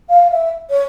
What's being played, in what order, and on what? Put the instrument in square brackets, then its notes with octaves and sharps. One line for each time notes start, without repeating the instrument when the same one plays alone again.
[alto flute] F5
E5
C#5